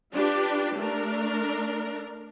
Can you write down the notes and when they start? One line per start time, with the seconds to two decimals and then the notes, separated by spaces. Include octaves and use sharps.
0.14 D4 F4 G4 B4
0.76 A3 D4 A#4